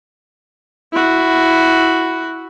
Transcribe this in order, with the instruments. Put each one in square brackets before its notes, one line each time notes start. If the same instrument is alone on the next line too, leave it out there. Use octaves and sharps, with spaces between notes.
[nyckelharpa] E4 F#4